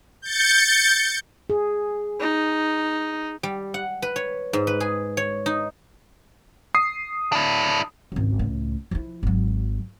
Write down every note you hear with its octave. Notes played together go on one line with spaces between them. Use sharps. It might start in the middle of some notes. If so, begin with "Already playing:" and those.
G6 A6 C#7
G#4
D#4
G3
F#5
B4
C#5
G#2
B4
G#4
C#5
D#4
D#6 C7
D4 E4
G#1 C#2
C#2 A2
F3 E4
G#1 F#3